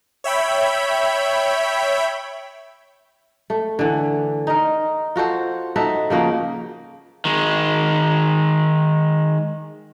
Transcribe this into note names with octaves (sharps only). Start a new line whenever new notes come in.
C#5 E5 G5 B5
A3
D3 E3
D#4 A#4
F4 F#4 A4 C5
D#4 F#4 A4 E5
C#3 F3 A#3 F#4
D#3 G#3